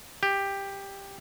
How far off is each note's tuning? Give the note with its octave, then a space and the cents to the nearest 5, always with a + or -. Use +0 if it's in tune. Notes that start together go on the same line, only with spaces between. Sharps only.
G4 +10